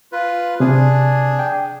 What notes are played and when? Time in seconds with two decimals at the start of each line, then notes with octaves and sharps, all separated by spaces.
0.12 F4 B4
0.60 C3 D4 G#4
1.39 G5